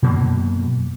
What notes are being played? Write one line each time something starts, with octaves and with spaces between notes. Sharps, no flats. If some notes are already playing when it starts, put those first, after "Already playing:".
F#2 B2 F#3 A#3